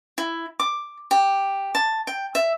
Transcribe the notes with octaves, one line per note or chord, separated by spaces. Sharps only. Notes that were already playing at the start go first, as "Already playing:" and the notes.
E4
D6
G4
A5
G5
E5